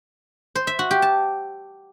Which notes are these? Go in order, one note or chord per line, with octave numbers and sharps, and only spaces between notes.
C5
E5
F#4
G4
A5